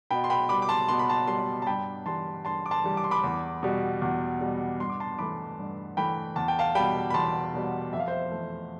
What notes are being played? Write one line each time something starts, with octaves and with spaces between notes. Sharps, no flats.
B2 G5 B5
C6
G5 B5
G3 B5 D6
D6
A5 C6
B2 C6
B5
A5 C6
G3 A5 C6
A5
G2 G5 B5
E3 G3 A5 C6
G2 A5 C6
D6
A5 C6
E3 G3
D6
C6
B5 D6
E2
B2 G3
E2
B2 G3
G2 C6
D6
A5 C6
E3 A3 B5 D6
G2
E3 A3 G5 B5
E2 A5
G5
F5 A5
B2 G3 G5 B5
B5
E2 A5 C6
B2 G3
F2 E5
F5
C5 E5
E3 A3